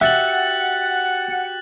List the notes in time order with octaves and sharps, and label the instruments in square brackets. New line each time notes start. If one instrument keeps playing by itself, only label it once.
[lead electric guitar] F#4 G4 [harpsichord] E5 [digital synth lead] F#5 [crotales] F#6 A6 F#7